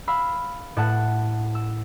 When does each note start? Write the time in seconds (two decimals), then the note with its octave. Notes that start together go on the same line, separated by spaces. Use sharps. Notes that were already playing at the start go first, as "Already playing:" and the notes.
0.08 F5 B5 E6 B6
0.77 A2 F#5 A5
1.55 E6